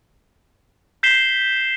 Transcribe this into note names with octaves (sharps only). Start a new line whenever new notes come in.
G6 B6 C7 E7 G7